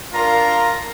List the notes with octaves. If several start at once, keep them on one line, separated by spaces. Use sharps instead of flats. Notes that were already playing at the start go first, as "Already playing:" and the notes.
D4 F4 A#4 A#5